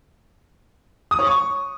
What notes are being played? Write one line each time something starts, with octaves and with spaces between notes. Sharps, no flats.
D#6
C#5
C#6